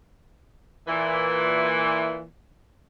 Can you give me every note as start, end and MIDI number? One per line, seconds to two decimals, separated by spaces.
0.87 2.25 46
0.87 2.25 52